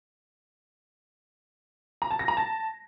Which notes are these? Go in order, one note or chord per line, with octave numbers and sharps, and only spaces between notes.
A#5
A5
A#6
A#5
A5